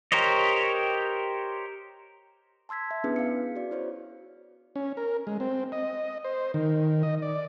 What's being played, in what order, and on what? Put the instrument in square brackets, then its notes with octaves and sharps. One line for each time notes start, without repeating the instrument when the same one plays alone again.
[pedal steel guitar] G4 A#4 C5 C#5 D#5
[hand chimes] A5 C6 E6 G#6 B6
E5
B3 C#4 D4 E4 G#4 B4
F5 C#7
F#4 D5
E4 C5 C#5
[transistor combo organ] C#4
A#4
G#3
C4
D#5
C5
D#3
D#5
D5